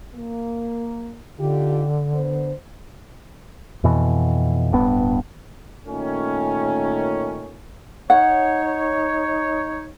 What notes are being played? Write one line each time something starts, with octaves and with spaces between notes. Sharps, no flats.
A#3
D3 D#4 F4 G4
B3 D4 C5
F2 B2 E3
D1 G2 B3
A#2 D#3 A3 C#4
D#4 C#5 F#5